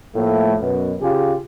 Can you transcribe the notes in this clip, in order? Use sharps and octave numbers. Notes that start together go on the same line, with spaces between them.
A2 F3 A3 A#3
F#2 B2
C#3 F4 G4 G#4